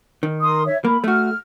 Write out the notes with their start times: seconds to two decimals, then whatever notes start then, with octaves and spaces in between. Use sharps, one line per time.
0.23 D#3
0.41 A#4 C6 D#6
0.66 C#5 E5
0.85 A#3 B5
1.04 A3 F#4 F6